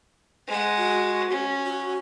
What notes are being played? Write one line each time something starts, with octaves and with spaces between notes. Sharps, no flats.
G#3 F#5
F#4
C#4
F#4